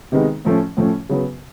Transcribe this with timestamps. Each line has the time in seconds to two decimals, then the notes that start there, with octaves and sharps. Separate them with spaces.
0.12 C3 D#3 G#3 B3 D#4
0.45 A2 F3 A3 C#4
0.77 A2 F3 A3 C#4
1.09 C#3 F#3 B3